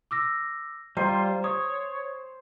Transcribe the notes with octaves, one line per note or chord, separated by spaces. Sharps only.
D6 E6 A#6
G3 F4 C5 A#5
C#5 D#6